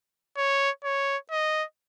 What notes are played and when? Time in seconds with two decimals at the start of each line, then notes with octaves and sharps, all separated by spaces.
0.37 C#5
0.84 C#5
1.31 D#5